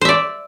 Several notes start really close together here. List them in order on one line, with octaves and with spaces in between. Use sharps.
C5 E5 D5